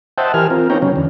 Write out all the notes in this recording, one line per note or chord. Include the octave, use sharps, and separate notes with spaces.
C5 D#5 E5 F#5 G5 A5
E3 G4 A#4 G#5 F6
C4 F4 A#4
B3 C4 D#4 C#5 G5 A#5
C#3 F#3 C#4
E2 D3